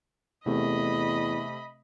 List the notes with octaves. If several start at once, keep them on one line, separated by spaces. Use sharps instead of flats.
E2 C3 A3 D#5 B5